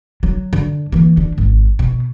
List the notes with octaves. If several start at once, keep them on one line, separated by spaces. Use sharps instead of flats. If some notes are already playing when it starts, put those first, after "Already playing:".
F#3
D3
E3 A#3
D3
G#1
B2